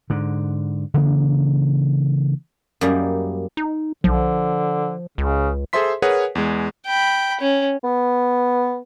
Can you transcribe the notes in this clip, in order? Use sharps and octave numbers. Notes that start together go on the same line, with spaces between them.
G#2 D3
C#3 E3 A#3 D4
F#2 G3 A#3 D#4 E4
D#4
B1 D3 F3
C#2 C#3
G#4 A4 C5 E5 C6 B6
G#4 A#4 B4 C#5 F#5 G#5
E2 G#3
G5 B5
C#4
B3